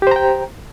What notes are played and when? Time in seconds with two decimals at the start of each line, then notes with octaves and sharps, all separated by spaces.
0.02 G4
0.07 C5
0.11 A#5
0.16 G5